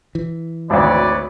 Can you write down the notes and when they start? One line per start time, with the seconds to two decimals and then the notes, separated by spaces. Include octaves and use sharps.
0.15 E3
0.70 G#1 D2 B4 C#5 D5